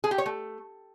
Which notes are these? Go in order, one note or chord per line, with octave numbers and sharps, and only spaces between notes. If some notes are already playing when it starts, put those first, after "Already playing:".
G#4
G4
C#5
A3